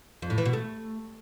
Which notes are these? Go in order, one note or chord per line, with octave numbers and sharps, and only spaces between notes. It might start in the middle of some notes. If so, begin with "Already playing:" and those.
F2
A2
E3
B2
A3